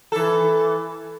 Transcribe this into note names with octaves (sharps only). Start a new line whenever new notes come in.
E3 A4